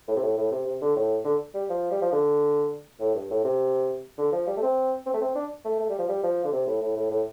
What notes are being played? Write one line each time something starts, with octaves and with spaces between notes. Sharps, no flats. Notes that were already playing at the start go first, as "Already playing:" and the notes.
A2
C3
A2
A2
C3
C3
D3
A2
D3
G3
F3
G3
F3
D3
A2
G2
A2
C3
D3
F3
G3
A3
C4
C4
A3
C4
D4
A3
A3
G3
F3
G3
F3
D3
C3
A2
A2
A2
A2